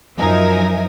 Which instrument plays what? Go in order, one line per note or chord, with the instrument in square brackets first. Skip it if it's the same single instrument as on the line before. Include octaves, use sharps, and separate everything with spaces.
[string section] F#2 F3 D#4 A#4 E5 G#5